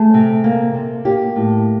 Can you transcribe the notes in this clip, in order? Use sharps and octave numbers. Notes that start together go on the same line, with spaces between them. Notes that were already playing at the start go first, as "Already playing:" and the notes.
Already playing: A3 G#4
C3
A#3
C3
A#3 G4
A2